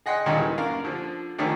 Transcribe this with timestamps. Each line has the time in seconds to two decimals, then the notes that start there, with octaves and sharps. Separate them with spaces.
0.06 G#4 D#5 F#5 G5 C6 F#6
0.26 D#2 A#2 D#3 G3 G#3 C#4
0.39 E3
0.58 F#2 D4 A#4 F5
0.85 D3 F3
1.38 D3 D#3 F3 A3 C#4 D4